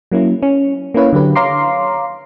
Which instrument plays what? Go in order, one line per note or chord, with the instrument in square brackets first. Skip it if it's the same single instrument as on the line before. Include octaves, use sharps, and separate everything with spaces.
[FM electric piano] F#3 A#3 C#4 E4
C#4
A#3 C#4 E4 B4 C#5 F5
D3 F#3 G4 B4
C#5 F5 A#5 C6 D6 C7